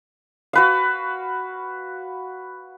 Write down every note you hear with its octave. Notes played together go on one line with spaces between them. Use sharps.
F#4 B4 F5